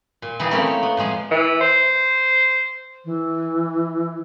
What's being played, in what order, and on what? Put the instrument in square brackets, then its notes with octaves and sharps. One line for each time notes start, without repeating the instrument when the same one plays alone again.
[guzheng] A#2
E3 G3 D#4 G#4
A3 A#3 C4 C#4 E4 A#4
C#5
B3
A2 F3 G#3 G#5
[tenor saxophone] E3
C5
[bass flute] E3